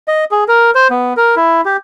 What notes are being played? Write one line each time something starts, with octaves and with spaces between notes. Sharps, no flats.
D#5
G#4
A#4
C5
B3
A#4
E4
G4